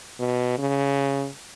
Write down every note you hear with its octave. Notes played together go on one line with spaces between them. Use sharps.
B2
C#3